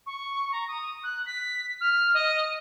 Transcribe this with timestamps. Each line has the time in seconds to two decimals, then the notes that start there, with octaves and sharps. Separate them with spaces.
0.06 C#6
0.52 A#5
0.68 D#6
1.04 F#6
1.26 B6
1.81 F6
2.14 D#5